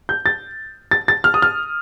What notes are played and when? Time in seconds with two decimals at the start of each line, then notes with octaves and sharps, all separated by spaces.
0.09 G6
0.26 A6
0.91 A6
1.08 A6
1.24 F6
1.34 D#6
1.42 F6